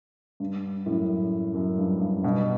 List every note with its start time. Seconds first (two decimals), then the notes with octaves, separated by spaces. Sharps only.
0.40 G2
0.86 F#2 A2
1.54 F#2
1.78 G2
2.00 G2
2.23 G2 B2